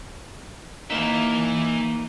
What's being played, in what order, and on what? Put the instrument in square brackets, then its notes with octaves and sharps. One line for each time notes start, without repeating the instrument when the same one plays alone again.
[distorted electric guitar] E3 E5 [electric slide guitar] A#3 D#4